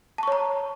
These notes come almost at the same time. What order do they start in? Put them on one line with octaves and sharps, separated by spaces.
A5 C#6 C#5 A#5